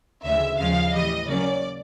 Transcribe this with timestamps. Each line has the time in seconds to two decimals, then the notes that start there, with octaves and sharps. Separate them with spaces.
0.25 D2 C#3 E3 G#3 E5
0.58 D#2 C#3 F3 G#3 F5
0.93 A2 E3 G3 D#5
1.27 C#3 F#3 A#3 C#4 D5